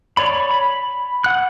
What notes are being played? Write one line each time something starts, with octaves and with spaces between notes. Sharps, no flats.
C#5 D5 B5
B5
F#5 F#6